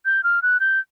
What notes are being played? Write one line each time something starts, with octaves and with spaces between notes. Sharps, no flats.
G6
F6
F#6
G6